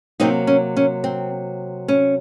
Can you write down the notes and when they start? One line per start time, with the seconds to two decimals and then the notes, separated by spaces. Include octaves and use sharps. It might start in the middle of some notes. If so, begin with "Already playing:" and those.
0.20 C3 F#3 A#3 C4 D#4
0.47 C#4
0.77 C#4
1.04 C4
1.88 C#4